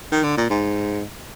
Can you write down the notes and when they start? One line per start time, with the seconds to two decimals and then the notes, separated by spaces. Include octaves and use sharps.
0.11 D#3
0.24 D3
0.37 A#2
0.50 G#2